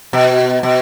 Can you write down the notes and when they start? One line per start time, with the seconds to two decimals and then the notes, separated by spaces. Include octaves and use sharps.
0.13 B2
0.63 B2